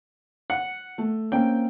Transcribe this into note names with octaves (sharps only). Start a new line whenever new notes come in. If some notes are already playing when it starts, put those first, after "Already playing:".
F#5
A3
A#3 C4 C#4 G5